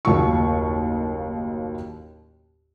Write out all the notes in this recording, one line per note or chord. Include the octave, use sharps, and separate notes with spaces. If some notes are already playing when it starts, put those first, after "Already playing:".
F#1 D#2 A2 F4 F#4 C#6